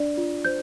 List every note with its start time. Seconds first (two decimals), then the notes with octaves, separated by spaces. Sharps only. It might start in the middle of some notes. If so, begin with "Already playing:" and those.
Already playing: D4 D5
0.17 F4
0.45 C5 G6